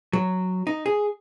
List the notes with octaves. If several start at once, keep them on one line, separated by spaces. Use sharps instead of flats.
F#3
D#4
G#4